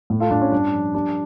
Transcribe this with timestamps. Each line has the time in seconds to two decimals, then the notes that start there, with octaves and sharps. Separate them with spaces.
0.10 A2
0.20 F4 A4
0.31 A2 D4
0.42 C#4
0.52 G2 D4
0.73 F3
0.94 G3 D4